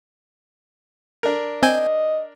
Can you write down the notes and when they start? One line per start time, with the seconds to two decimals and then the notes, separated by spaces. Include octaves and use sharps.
1.23 D4 A#4
1.63 C4 D#5 G#5 G6